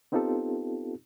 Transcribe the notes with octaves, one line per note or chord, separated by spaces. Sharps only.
B3 C4 D#4 F4 G4 A4